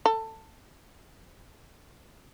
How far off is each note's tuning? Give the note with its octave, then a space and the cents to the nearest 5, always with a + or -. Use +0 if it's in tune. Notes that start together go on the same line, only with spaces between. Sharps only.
A4 +15